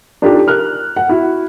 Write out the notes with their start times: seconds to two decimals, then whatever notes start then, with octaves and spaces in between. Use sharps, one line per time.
0.22 D4 D#4 F4 G4 A4
0.47 A#4 F6 F#6
0.96 F#5
1.09 E4 F#4